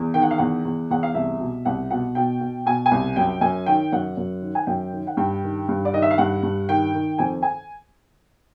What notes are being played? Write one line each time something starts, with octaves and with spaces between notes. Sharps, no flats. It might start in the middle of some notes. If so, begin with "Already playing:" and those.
Already playing: E2
D#3 G5
F#5
F5
E2 F#5
E2
E2 F#5
F5
C2 E5
B2
C2 F#5
B2 F#5
B2 G5
B2
B2 G#5
G#5
C2
F#2 G5
F#2 G#5
D#3 G5
F#2 F#5
F#2
D#3
G#5
F#2 G5
D#3
F#5
G2 G5
D#3
G2
D5
D#3 D#5
E5
F5
G2 F#5
G2
D#3 G5
D#3
F2 G#5
G#5